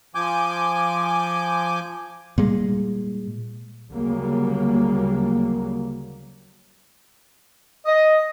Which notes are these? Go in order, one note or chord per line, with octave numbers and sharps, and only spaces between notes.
F3 G#5 D6 G6
A#2 G3 G#3
D2 C#3 F#3 G3 A#3
D#5